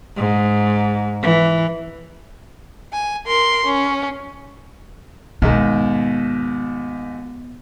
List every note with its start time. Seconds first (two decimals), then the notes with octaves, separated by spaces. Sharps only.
0.16 G#2
1.22 E3
2.93 G#5
3.27 A#4 C6
3.66 C#4
5.42 D#2 G#2 B2